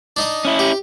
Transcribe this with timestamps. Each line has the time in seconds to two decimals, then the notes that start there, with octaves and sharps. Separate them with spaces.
0.16 D4 D#4 D#5
0.45 C#4 E4
0.59 G4